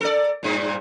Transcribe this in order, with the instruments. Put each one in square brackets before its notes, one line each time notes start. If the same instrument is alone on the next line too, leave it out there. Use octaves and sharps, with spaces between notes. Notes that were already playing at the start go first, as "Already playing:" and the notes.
[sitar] A4 A#4 D5
G2 A#2